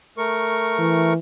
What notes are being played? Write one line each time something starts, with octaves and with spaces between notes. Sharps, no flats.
A3 A#4 C#6
E3